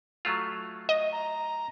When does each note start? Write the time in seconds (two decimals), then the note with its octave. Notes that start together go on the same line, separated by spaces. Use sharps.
0.25 F#3 A3 F4
0.89 D#5
1.12 A#5